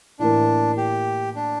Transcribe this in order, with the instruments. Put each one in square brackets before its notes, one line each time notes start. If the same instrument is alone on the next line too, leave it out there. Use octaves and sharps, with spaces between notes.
[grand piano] A2 E3 A#3 E4 A#4 [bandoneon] D4
[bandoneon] G4
D4